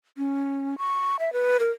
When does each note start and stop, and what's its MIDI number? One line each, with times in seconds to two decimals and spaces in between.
0.18 0.78 61
0.78 1.16 85
1.19 1.33 76
1.33 1.57 71
1.60 1.71 70